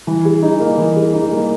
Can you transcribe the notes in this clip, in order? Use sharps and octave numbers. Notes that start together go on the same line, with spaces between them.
E3
G#4
D#4
A#3
E3
G#4
D#4
A#3